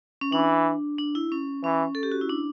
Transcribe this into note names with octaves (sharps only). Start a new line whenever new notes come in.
C#4
E3 D4
D4
E4
C#4
E3 C#4
A4
G4
F#4
E4
D4